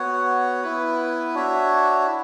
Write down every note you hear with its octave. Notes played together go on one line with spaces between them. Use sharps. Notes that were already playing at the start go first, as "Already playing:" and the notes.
Already playing: B3 F#4 C#5 F#5
B3 E4 B4
D4 F#4 C#5 E5
E4